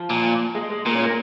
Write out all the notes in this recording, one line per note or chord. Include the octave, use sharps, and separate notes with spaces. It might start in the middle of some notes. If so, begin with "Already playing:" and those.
Already playing: F3
A#2
G#3
G#3
A#2 A#3
C#4
A#4